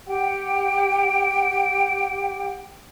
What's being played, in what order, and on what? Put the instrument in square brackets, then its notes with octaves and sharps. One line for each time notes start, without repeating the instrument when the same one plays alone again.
[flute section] G4 F#5 G5